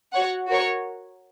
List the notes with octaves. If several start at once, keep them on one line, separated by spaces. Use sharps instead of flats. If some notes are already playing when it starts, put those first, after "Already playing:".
F#4 C#5 F#5
F#4 A#4 C#5